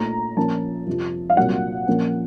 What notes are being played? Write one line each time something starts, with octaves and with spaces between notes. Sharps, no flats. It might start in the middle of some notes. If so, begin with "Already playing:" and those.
Already playing: A#2 A3 D#4 A#5
A#2 F3 A#3 C#4 A5
F2 C3 F3
F5
C2 A#2 F#3 A#3 F#5
A#2 F3 A#3 C#4